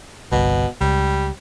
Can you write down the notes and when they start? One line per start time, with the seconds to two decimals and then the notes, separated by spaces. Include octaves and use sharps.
0.32 G1 C2 B2
0.81 C#2 G3